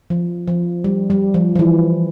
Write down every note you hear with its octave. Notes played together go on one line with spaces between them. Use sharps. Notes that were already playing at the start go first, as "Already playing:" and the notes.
F3
F3
G3
G3
F3
F3
E3